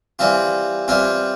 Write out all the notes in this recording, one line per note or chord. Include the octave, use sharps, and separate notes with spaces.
E3 G3 C4 F4
E3 G3 C4 F4